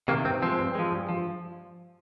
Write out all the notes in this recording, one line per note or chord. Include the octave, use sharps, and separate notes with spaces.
C3 D#3 A#3
G2 C4
F3 G#3 C4
G2
F3 G#3
G2
F3